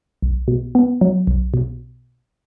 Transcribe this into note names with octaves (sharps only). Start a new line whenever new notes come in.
B1
B2
B3
F#3
B1
B2